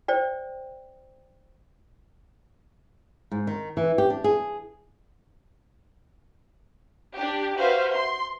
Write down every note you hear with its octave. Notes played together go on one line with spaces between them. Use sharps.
C5 D5 G5
G#2
D#3
E3
G4
D4
G#4
D4 G4
F#4 B4 C5 E5 F5
C6